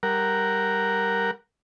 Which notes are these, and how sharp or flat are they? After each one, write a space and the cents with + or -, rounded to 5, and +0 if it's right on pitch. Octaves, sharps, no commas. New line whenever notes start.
G3 +0 A#4 +0 F#5 +0